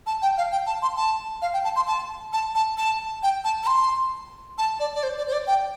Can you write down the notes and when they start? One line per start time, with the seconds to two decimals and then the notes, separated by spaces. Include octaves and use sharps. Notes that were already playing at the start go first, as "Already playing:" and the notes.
0.06 A5
0.22 G5
0.37 F5
0.52 G5
0.66 A5
0.82 C6
0.96 A5
1.42 F5
1.54 G5
1.64 A5
1.76 C6
1.87 A5
2.33 A5
2.55 A5
2.77 A5
3.23 G5
3.44 A5
3.63 A5
3.67 C6
4.58 A5
4.80 D5
4.94 D5
5.03 C5
5.17 D5
5.28 C5
5.33 D5
5.47 G5